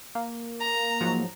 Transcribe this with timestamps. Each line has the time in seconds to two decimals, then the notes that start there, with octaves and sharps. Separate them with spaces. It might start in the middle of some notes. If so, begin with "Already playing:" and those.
0.15 A#3
0.60 A#5
1.00 G#2 F3 F#3